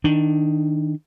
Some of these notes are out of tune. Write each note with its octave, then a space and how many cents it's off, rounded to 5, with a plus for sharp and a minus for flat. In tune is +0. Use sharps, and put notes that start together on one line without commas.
D#3 +15 D4 +20